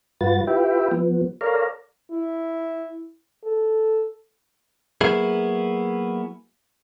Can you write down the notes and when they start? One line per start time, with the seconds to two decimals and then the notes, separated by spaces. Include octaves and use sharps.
0.21 G2 F4 F#4 B4 A6
0.47 E4 F4 G4 B4 E5 G5
0.91 F3 B3
1.41 A4 A#4 C#5 D5 F5 A#5
2.11 E4
3.44 A4
5.01 F#3 A#3 B3 E4 G#4